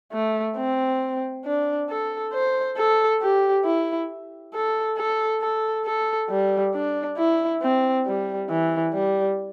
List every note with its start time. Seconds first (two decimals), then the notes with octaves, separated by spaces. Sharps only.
0.13 A3
0.58 C4
1.45 D4
1.90 A4
2.33 C5
2.77 A4
3.22 G4
3.65 E4
4.54 A4
4.98 A4
5.42 A4
5.85 A4
6.30 G3
6.74 D4
7.18 E4
7.62 C4
8.07 G3
8.49 E3
8.94 G3